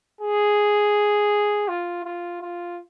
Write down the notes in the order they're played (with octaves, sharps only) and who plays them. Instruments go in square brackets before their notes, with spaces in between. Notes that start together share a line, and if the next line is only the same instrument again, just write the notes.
[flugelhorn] G#4
F4
F4
F4